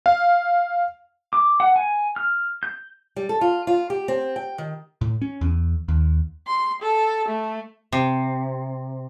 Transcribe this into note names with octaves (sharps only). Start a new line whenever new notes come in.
F5
D6
F#5
G#5
F6
G6
G3
A4
F4
F4
G4
C4
G5
D#3
A2
C#4
E2
D#2
C6
A4
A3
C3